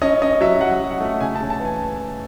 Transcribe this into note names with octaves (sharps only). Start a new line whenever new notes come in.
C#4 D#5
C#4 D#5
F#3 E5
F#3 F#5
F#3
F#5
A3
C#3 G#5
A5
C#3
A5
E3
G#5